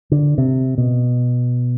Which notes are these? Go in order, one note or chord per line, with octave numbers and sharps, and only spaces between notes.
D3
C3
B2